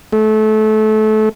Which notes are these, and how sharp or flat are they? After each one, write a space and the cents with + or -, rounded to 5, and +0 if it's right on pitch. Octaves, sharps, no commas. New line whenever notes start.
A3 -25